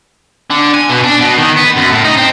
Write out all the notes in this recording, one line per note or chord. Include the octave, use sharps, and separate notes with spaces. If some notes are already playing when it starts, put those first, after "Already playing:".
D3
G#5
B2
D4
B2
D#3
B3
F#2
A2
D#4
C4